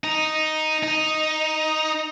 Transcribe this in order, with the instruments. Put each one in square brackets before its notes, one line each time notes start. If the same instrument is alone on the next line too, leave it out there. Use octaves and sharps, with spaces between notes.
[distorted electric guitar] D#4
D#4